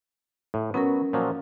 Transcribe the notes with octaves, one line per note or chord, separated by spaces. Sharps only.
A2
F#3 B3 C#4 A#4
A#2 F3 F#3